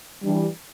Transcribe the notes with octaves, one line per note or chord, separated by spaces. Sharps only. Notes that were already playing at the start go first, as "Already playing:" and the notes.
E3 G3 D4